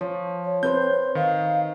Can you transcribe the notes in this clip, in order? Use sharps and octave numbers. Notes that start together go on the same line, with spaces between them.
F3 C#5
C#5
C4 B4 C5 G6
D#3 F5